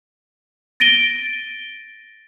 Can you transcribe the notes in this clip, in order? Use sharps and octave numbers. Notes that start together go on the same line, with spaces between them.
A6 A#6 D7 D#7 G7